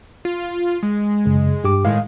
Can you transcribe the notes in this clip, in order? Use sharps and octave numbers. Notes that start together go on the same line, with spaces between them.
F4
G#3
F#2 C#3
G2 G4 D6
A2 D#3 G#3 F5